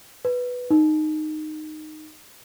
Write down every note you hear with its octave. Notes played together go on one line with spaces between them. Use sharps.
B4
D#4